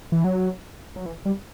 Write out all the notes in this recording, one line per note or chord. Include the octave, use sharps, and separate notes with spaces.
E3
F#3
F#3
E3
G3